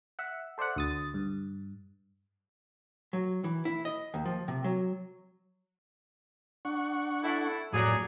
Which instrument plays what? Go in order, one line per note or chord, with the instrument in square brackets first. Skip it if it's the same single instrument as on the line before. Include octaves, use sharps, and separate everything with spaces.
[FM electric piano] E5 F#5
A4 C5 D5 E5 F#5
D2 D#6 A6
G2
[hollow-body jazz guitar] F#3
E3
E4
D#5
D#2
F3
C3
F#3
[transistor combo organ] D4 F#5 C#6
[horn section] E4 A4
[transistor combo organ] F2 A2 [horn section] F#3 G#4 D5